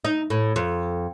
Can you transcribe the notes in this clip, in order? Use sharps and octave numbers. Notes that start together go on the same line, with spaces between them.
D#4
A2
F2